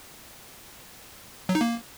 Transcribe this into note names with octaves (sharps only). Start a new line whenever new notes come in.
F#3
D#4
A#3